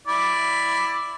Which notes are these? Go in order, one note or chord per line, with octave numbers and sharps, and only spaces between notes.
E4 D5